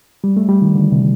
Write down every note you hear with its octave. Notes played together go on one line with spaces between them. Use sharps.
G3
A3
G3
D#3
D3
C3